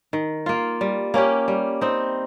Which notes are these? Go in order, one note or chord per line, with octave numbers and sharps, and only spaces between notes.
D#3
A#3 F4
G3
A#3 C#4 G4
G3
C4 D#4